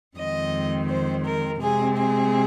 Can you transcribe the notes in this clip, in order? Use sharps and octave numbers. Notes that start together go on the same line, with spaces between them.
F2 D#3 G#3 C4 D#5
C5
A#4
C3 G#3 C4 G#4
G#4